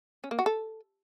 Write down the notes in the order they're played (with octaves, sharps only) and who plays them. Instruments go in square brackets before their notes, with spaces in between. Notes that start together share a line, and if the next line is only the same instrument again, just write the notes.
[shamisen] C#4
A#3
F#4
A4